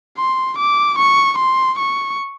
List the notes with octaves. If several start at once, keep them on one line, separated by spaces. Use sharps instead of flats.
C6
D6
C#6
C6
C#6